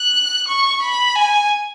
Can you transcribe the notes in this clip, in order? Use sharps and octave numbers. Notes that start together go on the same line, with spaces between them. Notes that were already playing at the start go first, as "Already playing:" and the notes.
Already playing: F#6
C#6
B5
G#5